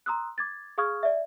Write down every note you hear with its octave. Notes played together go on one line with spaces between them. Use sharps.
A#5 C6 D#6 E6 F#6
D6 G#6 A6
G#4 F5 C#6 D#6 F6 G#6
D5 E5